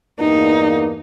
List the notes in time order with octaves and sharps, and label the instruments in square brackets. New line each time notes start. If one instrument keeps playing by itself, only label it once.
[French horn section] E2 G2 A#3 [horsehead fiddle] D#4